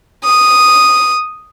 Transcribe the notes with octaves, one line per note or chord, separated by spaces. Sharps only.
D#6